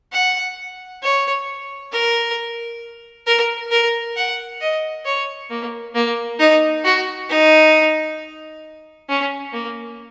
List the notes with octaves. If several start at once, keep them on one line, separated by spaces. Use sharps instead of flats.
F#5
C#5
A#4
A#4
A#4
F#5
D#5
C#5
A#3
A#3
D#4
F#4
D#4
C#4
A#3